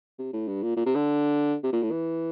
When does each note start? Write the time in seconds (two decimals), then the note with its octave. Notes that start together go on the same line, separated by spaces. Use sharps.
0.19 C3
0.33 A2
0.48 G2
0.63 A#2
0.76 A#2
0.86 C3
0.95 D3
1.63 C3
1.73 A#2
1.83 A2
1.92 E3